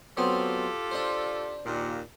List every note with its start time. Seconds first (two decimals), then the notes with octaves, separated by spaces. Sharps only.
0.17 F#3 B3 C4 F4 G4 A4
0.91 D4 C5
1.66 D#2 A#2